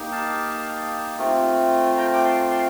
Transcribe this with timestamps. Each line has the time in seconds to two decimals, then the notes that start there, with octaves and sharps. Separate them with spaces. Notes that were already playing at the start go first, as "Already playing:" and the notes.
Already playing: A#3 D#4 G4
0.12 F5 A5
1.18 A3 C4 F4
1.98 G5 A#5
2.14 D6
2.24 A5 C6
2.51 A5 C6